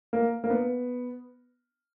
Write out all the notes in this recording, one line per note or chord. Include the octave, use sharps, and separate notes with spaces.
A#3
A#3
B3